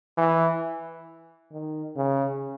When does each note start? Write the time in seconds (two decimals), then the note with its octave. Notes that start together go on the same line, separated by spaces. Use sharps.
0.18 E3
1.52 D#3
1.96 C#3